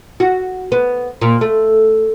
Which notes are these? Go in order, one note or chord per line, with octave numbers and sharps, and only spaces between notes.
F#4
B3
A#2
A3